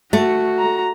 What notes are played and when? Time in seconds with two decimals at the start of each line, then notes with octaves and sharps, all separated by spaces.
0.13 A3 F#4
0.59 A#5